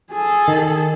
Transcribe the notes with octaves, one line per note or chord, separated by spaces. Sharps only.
G#4 A4
D#3